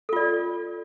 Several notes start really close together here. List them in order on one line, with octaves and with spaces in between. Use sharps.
A4 F4 D5